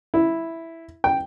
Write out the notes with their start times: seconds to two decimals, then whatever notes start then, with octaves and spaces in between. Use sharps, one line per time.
0.14 E4
1.04 G5